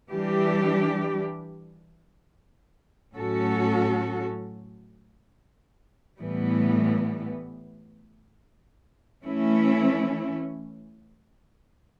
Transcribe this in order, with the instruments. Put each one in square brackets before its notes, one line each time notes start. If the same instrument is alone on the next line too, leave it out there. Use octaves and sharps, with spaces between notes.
[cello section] E3 G3 D4 G4
A2 F#3 C#4 F#4 A4
A2 E3 G3 B3
E3 A3 C#4 E4